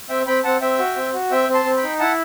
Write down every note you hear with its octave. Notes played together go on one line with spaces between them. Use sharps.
C4 E5 G5
C4 G5 B5
C4 F#5 A5
C4 E5 G5
F#4
C4
F#4
C4 E5 G5
C4
A5 C6
C4
G5 B5
D#4
E4 F#5 A5